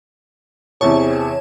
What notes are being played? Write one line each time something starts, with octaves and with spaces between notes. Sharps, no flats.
E2 C3 E3 C4 G#4 C#5 A5 C#6